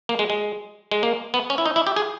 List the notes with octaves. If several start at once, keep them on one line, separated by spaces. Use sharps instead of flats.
A#3
G#3
G#3
G#3
A#3
B3
C#4
E4
D#4
E4
G4
G#4